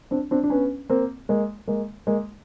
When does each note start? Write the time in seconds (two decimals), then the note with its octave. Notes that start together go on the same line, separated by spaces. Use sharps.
0.11 C4 D4
0.31 C4 D4
0.44 D4
0.50 B3 C#4
0.90 A#3 C4
1.29 G#3 A#3
1.67 G#3 A#3
2.07 G#3 A#3